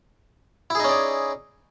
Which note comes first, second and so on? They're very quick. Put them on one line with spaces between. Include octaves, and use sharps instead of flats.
E4 G#4 D#4 C#4 D5